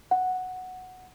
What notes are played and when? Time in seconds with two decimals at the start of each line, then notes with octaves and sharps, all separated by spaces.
0.11 F#5